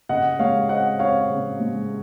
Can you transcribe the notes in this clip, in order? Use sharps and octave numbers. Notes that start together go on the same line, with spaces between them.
C#3 D#5 F#5
G#3 C#5 F5
C4 D#5 F#5
C4 C#5 F5
C#3
G#3